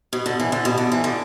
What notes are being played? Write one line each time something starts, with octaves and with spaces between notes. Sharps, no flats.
B2
D3
E3
D3
B2
D3
E3
D3